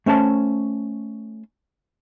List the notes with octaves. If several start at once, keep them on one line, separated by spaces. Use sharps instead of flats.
A3 C#4 C5 A5